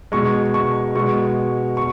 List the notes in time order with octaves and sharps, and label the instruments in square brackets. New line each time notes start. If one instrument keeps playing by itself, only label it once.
[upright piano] B2 G#3 C#6
C#6
B2 G#3 C#6
C#6